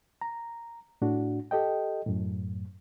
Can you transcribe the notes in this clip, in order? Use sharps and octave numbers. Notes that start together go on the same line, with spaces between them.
A#5
A2 D4 F#4
G4 A4 D#5 G5
F#2 A2